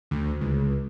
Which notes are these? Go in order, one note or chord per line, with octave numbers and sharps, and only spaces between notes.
D2
C#2